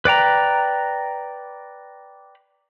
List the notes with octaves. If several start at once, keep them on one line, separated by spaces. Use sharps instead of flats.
B4 D5 G5 A#5